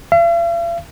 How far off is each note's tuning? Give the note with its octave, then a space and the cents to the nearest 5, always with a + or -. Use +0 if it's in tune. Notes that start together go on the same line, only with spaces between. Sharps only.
F5 -45